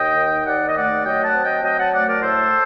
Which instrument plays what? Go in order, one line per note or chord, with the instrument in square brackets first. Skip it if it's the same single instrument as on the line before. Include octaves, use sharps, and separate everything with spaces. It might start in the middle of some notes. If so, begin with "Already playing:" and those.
Already playing: [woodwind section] D#2 D#5 G5
D#3
D#2 D5 F#5
D#5
A3 D5 F#5
F#3 D#5 G5
F#5 A5
C4
D#5 G5
F#3 D#5 G5
F#5 A5
A3 D5 F#5
A#4 D5
A2 A4 C5